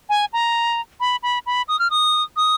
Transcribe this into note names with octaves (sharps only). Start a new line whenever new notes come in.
G#5
A#5
B5
B5
B5
D#6
F6
D#6
D#6